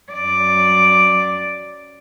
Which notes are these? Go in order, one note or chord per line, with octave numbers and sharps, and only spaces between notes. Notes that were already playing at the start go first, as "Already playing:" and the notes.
F#2 D5